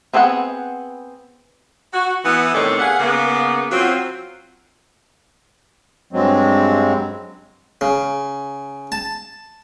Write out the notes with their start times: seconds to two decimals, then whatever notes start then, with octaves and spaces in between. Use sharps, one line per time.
0.14 B3 C4 G#4 A4 F#5
1.94 F#4
2.25 E3 B3
2.55 A2 C3 D#3 A4 C#5 D5
2.79 B3 G#4 F5 F#5
3.00 C#3 A#3 B3
3.72 F#3 C4 F4
6.13 G2 F#3 G#3 C4
7.81 C#3
8.92 A5